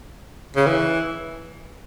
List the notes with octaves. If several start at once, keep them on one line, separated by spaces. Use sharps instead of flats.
C#3
E3